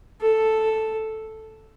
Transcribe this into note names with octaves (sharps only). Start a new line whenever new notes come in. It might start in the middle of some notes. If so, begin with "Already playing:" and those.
A4